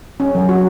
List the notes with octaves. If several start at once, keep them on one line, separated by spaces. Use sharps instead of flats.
C#4
F#3
F#4